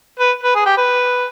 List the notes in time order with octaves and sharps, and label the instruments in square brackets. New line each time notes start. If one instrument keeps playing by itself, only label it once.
[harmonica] B4
B4
G#4
G4
B4